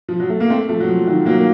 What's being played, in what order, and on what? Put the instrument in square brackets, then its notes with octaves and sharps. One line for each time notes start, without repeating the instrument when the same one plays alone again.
[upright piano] F3
F#3
A3
A#3
A3 C4
F3 A3
F#3
F3
D#3 F#3
F#3 A#3
A#3